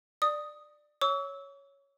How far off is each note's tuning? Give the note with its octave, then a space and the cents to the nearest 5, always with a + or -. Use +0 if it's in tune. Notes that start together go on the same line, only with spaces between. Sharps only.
D5 +15 D#6 +0
C#5 +0 C#6 +45 E6 -20